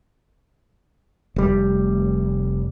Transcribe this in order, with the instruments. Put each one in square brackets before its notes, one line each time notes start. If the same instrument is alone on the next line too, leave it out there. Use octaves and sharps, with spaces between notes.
[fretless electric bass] F1 G3